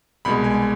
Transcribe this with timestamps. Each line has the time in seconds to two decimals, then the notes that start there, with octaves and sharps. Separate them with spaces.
0.25 C2 B2 G#3 B5
0.44 G#5